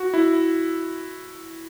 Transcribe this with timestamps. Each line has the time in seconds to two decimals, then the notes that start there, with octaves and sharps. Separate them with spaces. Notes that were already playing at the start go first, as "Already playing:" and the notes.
Already playing: F#4
0.14 E4